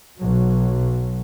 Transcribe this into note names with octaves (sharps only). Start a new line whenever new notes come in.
B1 F#3